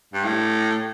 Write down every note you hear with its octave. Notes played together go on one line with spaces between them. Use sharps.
G2
A2